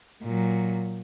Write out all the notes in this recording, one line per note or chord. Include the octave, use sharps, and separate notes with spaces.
A#2 F#3